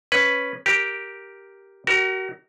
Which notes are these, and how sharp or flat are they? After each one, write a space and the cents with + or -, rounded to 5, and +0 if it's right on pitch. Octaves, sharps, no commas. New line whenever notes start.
C#4 +0 B4 +0
G4 -5 A#4 +0
F#4 +40 A#4 +0